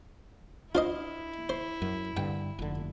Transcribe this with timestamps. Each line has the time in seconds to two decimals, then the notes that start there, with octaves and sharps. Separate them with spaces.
0.75 D4 E4 F4 C5 D#5
1.49 C5
1.82 F#2
2.17 G2 D3 G5
2.59 F1 D3